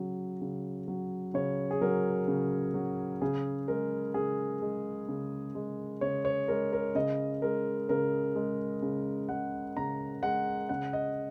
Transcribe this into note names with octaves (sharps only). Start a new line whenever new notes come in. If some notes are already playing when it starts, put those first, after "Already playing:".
Already playing: C#3 F#3
C#3
F#3
C#3 C#5
G#4
F#3 A#4
C#3
F#3
C#3 G#4
G#3 A#4
C#3 G#4
G#3
C#3
G#3
C#3 C#5
C#5
G#3 A#4
A#4
C#3 D#5
G#3 A#4
C#3 A#4
G#3
C#3
G#3 F#5
C#3 A#5
G#3 F#5
C#3 F#5
D#5